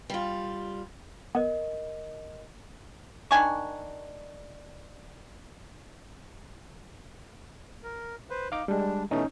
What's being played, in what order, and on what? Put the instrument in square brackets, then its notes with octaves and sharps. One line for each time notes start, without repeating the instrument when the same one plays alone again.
[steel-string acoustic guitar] G3 F4
[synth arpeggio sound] B3 [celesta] A#4 D#5
[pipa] D#3 D4 G#5 C#6
[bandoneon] A#4
B4 C5
[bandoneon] D#4 [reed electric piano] F5 D6
[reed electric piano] G3 G#3 [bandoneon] D4
[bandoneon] B2 E3 A3 [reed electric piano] C#4 D#4